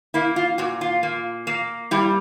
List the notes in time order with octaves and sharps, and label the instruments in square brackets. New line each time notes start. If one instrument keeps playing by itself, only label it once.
[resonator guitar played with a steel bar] A#3 E4
F4
A#2 F#4
F4
A#3
A#3
G3 E4